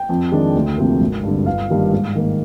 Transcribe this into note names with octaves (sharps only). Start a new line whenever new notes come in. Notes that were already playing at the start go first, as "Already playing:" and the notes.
Already playing: G5
F2
D#3 G#3 D4
D2
C3 F3 A#3
G#1
G2 D3
G1 F5
G2 D#3 G3 A#3
G#2
D#3 A#3